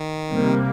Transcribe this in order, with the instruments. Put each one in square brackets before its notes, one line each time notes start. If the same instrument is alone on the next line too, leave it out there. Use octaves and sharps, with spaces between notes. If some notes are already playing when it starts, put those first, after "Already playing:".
Already playing: [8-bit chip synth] D#3
[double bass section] C3 G3 A#3